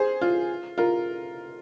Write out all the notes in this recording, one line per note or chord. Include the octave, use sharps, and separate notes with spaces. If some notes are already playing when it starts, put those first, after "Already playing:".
Already playing: G#4 C5
F4
F4 A#4